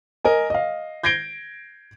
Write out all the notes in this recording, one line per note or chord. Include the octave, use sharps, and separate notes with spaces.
A#4 D#5 G#5
D#5 F5
G6 G#6 A#6 C7 D7 G7